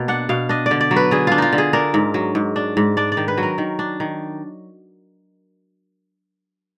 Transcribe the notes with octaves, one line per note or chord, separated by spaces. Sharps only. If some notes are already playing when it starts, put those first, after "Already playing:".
Already playing: B2 A#3
D4 F#5
B2 F5
D4 D#5
D5
D3
D5
F#3
B4
D3 G#4
D4 F4
D#4 F4
D3
G#4
D4 A#4
G#2
F#3
G#2
D4
G#2
D4 D5
D5
D#3
B4
F#3
A#4
D#3
D4
D#3